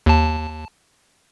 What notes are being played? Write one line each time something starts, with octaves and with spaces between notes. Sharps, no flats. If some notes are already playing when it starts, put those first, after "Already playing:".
D#2 A5